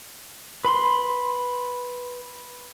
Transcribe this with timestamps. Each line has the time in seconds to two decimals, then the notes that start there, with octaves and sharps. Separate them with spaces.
0.65 B4 B5 C6